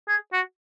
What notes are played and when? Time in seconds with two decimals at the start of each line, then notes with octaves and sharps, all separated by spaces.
0.08 G#4
0.33 F#4